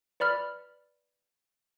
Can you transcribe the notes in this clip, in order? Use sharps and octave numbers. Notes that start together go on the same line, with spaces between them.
B4 D5 B5 F6